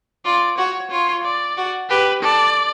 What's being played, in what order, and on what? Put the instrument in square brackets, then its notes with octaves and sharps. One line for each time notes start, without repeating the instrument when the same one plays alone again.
[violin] F4 [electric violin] D5
[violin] F#4 [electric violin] C#5
[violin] F4 [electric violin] C#5
[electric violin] D5
[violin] F#4
[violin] G4 [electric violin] B4
[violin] A4 [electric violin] D5